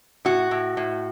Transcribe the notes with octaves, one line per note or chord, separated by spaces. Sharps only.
A2 F#4
A2
A2